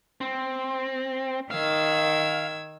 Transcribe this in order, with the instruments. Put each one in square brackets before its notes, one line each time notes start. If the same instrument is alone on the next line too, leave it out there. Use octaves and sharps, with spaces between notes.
[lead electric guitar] C4
[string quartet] D#3 E6 G#6 [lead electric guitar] F5